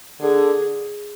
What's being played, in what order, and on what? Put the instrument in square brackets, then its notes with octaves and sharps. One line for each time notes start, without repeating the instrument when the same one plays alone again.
[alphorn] D3 [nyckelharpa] G#4